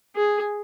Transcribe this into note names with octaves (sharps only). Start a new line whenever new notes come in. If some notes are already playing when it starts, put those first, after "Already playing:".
G#4